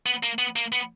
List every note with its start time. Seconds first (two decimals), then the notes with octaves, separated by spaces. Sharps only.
0.06 B3
0.23 A#3
0.39 B3
0.56 A#3
0.72 B3